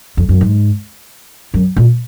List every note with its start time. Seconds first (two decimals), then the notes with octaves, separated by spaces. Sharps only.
0.17 F2
0.29 F#2
0.41 G#2
1.54 F#2
1.77 A#2